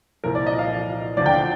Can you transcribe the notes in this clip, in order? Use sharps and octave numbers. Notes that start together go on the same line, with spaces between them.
C2 A#2 F3 A#4
D5
D#5
F5
D2 D3 F3 D5
G5
F5